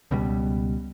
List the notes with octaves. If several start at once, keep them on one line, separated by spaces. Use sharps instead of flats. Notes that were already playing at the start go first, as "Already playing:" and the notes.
C#2 B2 G3